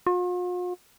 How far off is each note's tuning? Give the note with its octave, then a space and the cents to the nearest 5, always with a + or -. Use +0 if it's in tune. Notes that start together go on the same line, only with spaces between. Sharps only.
F4 +45